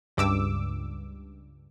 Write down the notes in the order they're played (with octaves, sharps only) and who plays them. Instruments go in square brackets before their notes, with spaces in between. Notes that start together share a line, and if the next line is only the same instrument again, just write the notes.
[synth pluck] C#2 G2 D6 E6